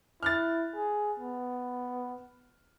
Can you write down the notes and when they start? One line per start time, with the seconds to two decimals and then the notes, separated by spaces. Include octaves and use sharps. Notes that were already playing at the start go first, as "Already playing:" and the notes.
0.23 E4 F6 F#6 A6
0.75 G#4
1.20 B3